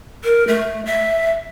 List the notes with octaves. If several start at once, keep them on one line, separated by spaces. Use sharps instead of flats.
A#4
A3
E5